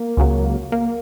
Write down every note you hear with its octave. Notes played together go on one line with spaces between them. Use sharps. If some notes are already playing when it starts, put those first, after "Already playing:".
Already playing: A#3
C#2 C#3 F#3
A#3